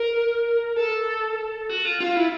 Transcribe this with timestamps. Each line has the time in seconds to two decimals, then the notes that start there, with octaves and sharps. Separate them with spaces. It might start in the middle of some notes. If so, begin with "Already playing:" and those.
Already playing: A#4
0.76 A4
1.69 F#4
1.85 F4
2.00 F4
2.16 E4